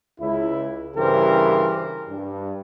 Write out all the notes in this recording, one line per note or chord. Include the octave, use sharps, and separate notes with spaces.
C#2 E4
G2 C#3 E3 G4 A#4 C5
G2